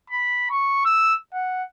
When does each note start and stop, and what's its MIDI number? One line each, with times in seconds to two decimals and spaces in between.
0.10 0.50 83
0.51 0.80 85
0.85 1.15 88
1.34 1.63 78